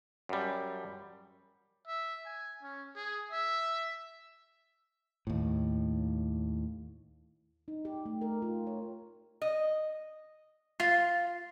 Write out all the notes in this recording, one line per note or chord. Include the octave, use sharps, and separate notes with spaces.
F#2 G3
E5
G#5
C#4
G#4
E5
D#2 A2
D#4
G4
A3
A#4
F4
C#5
D#5
F4 A6 C7